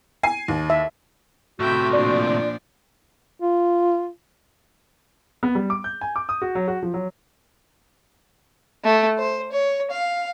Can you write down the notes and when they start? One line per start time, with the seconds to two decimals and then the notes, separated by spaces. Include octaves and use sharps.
0.23 G#5 C7
0.48 D#2
0.70 E5
1.60 A2 C3 F#4 E5 G5 B5
1.93 A#2 F3 D4 D5
3.40 F4
5.43 B3
5.55 G3
5.70 D6
5.84 G6
6.01 G#5
6.16 D6
6.29 D#6
6.42 F#4
6.55 F#3
6.68 F#4
6.83 F3
6.94 F#3
8.84 A3
9.18 C5
9.52 C#5
9.91 F5